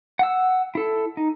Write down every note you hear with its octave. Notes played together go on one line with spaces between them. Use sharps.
F#5 E6
E4 A4
D#4